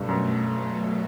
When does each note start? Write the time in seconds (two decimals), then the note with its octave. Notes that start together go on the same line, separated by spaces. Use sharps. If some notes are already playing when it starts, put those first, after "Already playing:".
Already playing: G2 B2 F#3 A3
0.09 F#2